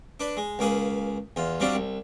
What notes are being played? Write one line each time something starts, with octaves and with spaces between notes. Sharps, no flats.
D4 B4
G#3
C#2 A#3 G#4 B4
E2 F4
F#3 G3 C4 D4 F4
C2